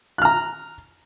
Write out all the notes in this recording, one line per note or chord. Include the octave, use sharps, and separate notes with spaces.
A#5 F6 F#6